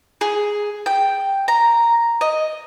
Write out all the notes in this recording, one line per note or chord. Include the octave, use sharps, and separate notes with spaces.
G#4
G5
A#5
D#5